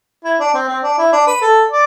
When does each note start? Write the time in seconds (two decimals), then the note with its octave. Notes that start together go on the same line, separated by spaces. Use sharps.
0.24 E4
0.40 D4
0.54 C4
0.68 C4
0.83 D4
0.98 E4
1.13 D4
1.27 B4
1.41 A4
1.70 D5